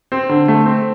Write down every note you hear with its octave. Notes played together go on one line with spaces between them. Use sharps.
C4
D3
A3
C4